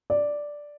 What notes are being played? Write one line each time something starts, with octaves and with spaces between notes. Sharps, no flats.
D5